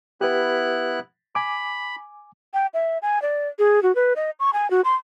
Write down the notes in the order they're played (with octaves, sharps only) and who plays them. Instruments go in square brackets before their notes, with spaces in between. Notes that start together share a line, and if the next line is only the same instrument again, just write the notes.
[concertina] B3 E4 F#6 [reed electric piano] G4 B4
[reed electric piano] G#5 D6 [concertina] B5
[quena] G5
E5
G#5
D5
G#4
F#4
B4
D#5
C#6
G#5
F#4
C6